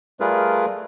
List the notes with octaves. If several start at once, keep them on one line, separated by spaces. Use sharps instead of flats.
G3 A3 F4 G#4 A#4 B4